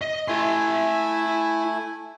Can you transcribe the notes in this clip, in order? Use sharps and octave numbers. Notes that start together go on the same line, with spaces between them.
D#5
A3 E4 G#5 C6